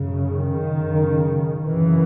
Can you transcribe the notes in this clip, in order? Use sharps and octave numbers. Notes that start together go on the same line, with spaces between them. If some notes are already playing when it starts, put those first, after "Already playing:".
Already playing: F#2 C#3
D#3
F#2 C#3
F#2 C#3 E3